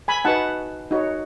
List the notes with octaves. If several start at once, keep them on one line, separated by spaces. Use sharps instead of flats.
G#5 B5
D#4 F#4 B4 F#5 A5
D#4 F#4 C#5